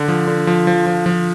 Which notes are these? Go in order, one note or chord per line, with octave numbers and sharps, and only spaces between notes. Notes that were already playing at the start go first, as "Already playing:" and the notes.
Already playing: D3
F3
D3
F3
F3
F3
F3